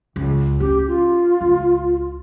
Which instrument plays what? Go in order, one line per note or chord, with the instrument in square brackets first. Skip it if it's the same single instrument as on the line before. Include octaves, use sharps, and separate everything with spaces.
[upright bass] C#2
[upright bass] C#4 [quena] G4
[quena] F4
[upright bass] C#2